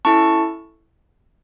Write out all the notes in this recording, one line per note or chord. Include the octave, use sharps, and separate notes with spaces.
C#4 E4 A4 A5 C#6